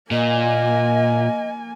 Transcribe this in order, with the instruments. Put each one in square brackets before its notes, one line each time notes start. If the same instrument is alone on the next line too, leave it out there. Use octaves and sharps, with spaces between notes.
[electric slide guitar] A#2 [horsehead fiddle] A#3 G#5 [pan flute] D#5